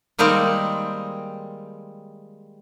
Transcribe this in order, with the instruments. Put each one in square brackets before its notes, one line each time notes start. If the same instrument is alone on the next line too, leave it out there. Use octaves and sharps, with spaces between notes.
[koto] D#3 G3 G#3 A#3 C4 D#4